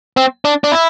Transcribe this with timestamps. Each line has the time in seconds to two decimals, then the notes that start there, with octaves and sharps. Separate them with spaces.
0.17 C4
0.45 D4
0.64 D4
0.72 E4